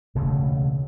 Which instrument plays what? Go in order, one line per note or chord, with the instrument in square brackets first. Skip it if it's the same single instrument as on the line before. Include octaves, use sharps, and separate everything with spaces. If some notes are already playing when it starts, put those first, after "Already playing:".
[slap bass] E1 D2 C#3 A3